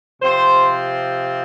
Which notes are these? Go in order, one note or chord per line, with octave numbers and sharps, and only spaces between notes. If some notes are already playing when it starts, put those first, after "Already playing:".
C3 F3 C4 C5